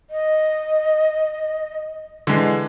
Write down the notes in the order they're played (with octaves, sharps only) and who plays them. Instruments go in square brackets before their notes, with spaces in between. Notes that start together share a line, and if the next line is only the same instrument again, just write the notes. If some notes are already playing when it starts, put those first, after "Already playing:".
[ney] D#5
[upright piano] D3 E3 G#3